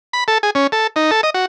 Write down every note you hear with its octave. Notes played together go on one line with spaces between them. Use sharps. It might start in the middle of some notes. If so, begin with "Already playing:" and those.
B5
A4
G#4
C#4
A4
D#4
A4
D#5
F#4